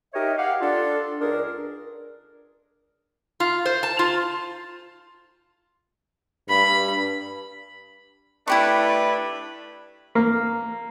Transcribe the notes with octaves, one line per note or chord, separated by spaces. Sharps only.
D#4 G4 A#4 C#5 D#5 E5
G4 F5 F#5
D4 F4 A4
C#2 D4 G#4 A#4
F4
C5
A5
F4
G2 B5
A3 D4 E4 G4 B4 C#6
A#3